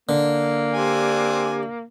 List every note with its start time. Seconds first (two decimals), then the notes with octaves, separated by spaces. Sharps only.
0.09 D3 A#3
0.73 C4 D4 G4 G#5